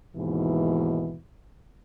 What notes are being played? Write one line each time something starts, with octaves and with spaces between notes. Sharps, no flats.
D#2 G#2 B2 E3